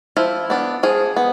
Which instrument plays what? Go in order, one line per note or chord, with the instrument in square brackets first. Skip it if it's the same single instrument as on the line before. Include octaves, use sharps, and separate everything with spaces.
[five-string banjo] F3 E4
B3 D4
F3 G#4
B3